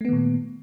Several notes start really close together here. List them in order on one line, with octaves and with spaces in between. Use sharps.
A3 B3 D#3 A#2